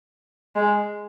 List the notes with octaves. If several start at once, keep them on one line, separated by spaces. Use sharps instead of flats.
G#3